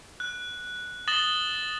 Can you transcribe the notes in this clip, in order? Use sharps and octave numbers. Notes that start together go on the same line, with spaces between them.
F#6
D#6 A6 A#6 E7 F#7 G7